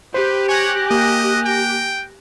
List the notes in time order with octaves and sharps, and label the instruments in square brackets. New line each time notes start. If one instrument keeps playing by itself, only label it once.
[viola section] G4 [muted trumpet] B4 [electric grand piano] C5
[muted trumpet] C#5 [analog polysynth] G#5 F#6 A#6
[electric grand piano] A#3 [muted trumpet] D#5
[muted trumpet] G5